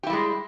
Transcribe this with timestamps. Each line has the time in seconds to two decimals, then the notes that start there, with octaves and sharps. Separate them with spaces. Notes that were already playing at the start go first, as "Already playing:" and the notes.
0.03 G4
0.07 E4
0.10 G3
0.13 G#3